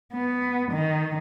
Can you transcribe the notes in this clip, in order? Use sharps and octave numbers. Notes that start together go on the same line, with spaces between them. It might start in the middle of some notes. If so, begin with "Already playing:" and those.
B3
D#3